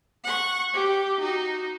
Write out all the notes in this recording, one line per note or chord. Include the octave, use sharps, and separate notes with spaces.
F#5 C#6
G4
D#4 F#4